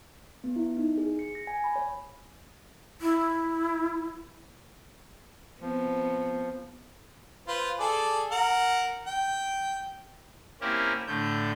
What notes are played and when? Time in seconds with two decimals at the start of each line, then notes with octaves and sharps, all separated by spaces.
0.44 B3
0.56 E4
0.77 D#4
0.97 G#4
1.19 C#7
1.35 A#6
1.47 G#5
1.64 B5
1.76 C#5
3.01 E4
5.61 F3 B3 C4
7.48 F4 B4 C5
7.79 G#4 A4 D5
8.31 A#4 F#5
9.06 G5
10.61 A#3 C4 C#4 E4 G4 A#4
11.07 A2 D3 A3 G6